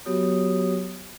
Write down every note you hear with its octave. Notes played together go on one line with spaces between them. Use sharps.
F#3 B3 F#4 G4 C#5 D#6